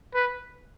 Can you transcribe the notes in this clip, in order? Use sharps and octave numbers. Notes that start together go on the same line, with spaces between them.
B4